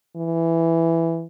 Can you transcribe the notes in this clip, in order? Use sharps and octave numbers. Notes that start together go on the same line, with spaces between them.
E3